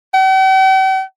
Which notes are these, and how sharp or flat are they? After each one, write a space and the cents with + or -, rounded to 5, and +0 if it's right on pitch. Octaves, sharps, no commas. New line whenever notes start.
G5 -45